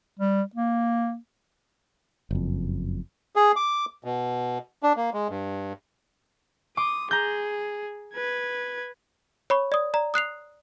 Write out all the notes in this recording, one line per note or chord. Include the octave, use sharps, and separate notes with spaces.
G3
A#3
F#1 F2
G#4
D6
B2
D4
A#3
G#3
G2
C6 D6 D#6
G#4 A#5 G6
B4 G#6
C#5 B5 C#6
D5 D#6
D5 A#5
D#6 F#6 C7 F7